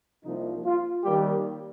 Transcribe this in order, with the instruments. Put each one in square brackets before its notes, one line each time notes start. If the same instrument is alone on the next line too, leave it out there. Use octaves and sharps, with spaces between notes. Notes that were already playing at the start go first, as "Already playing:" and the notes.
[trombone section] C2 C3 F3 A#3 D#4
F4
D#2 D#3 G3 A#3 G4